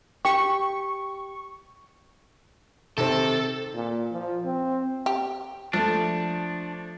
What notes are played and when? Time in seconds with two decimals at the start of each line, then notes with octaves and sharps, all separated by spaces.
0.25 G4 C#6
2.98 C3 D#3 C4 A4
3.75 A#2
4.12 F3
4.45 C4
5.06 G4
5.73 F3 A3 D4